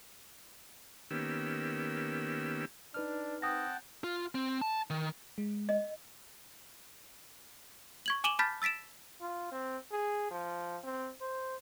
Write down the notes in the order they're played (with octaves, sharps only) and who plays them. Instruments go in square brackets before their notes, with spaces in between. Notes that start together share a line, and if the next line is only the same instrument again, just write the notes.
[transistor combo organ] D#3 A#3 B3 C#4 G4 E6
[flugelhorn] D4 [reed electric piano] D#4 B4 F6
[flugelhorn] C4 [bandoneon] F#5 G5 A5 [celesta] D#6 A#6
[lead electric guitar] F4
C4
A5
D#3
[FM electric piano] G#3
[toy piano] D#5
[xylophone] C#6 G#6 F#7
G#5 D6 D#7 E7 F#7 G7
A5 B5 F6 G6 A6 B6
E6 A6 B6 D7 E7
[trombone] F4
C4
G#4
F3
C4
C5